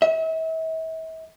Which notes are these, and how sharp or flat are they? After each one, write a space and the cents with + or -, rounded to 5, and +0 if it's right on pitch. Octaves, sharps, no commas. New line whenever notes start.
E5 -40